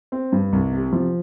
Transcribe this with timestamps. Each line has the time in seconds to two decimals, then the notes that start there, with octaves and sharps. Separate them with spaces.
0.12 C4
0.32 G2
0.53 C2
0.73 C3
0.93 F3